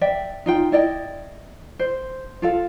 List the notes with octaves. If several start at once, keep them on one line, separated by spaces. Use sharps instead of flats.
D5 E5 G5
D#4 F4 G5
E4 D5 D#5 G5
C5
F4 A4 F5